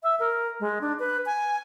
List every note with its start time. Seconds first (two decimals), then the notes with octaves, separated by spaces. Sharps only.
0.03 E5
0.20 A#4
0.60 G#3
0.81 D4
0.99 B4
1.26 G#5